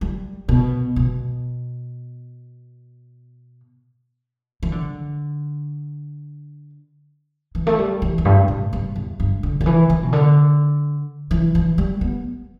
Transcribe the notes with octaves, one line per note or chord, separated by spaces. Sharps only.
G3
B2
B2
E3
D3
E3
A3
G3
E3
E2
G2
A2
G2
E2
G2
D3
D3
E3
E3
B2
D3
E3
E3
G3
B3